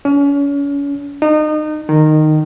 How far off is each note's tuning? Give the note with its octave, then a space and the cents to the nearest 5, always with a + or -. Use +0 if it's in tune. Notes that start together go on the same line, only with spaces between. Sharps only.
C#4 +35
D#4 -30
D#3 -15